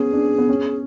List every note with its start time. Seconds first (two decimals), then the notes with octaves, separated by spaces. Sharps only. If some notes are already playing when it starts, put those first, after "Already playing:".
Already playing: B3 C#4 G#4
0.13 D4
0.38 B3
0.49 C#4